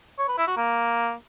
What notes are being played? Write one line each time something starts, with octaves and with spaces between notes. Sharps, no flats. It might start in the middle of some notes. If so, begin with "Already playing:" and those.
C#5
B4
E4
F#4
A#3